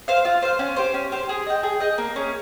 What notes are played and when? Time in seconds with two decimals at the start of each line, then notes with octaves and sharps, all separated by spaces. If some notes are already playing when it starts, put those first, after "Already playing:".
0.08 C5 F5
0.25 F4
0.42 C5 F5
0.59 C#4
0.76 G4 C5
0.94 C#4
1.12 G4 C5
1.29 G#4
1.47 D#5 G5
1.63 G#4
1.80 D#5 G5
1.98 A#3
2.16 C#4 G#4